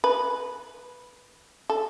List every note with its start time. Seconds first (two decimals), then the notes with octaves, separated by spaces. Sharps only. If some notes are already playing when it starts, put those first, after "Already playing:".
0.04 B4
1.70 A4